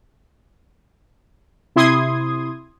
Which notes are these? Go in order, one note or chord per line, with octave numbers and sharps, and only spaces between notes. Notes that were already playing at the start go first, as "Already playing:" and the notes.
C3 E4 C6 D#6 G#6